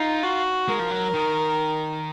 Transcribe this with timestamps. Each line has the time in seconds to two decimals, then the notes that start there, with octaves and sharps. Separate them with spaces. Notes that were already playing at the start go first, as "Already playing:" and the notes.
Already playing: D#4 F4
0.23 F#4
0.68 G#3 A#4
0.79 F3
0.91 F#3
1.14 D#3